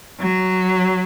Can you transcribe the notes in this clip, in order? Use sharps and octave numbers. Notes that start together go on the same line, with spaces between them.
F#3